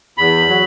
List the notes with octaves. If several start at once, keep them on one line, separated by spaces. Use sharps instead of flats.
E2 B5
F#3